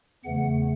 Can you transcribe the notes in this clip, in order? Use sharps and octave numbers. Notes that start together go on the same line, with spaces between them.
E2 C#3 E3 A3 F#5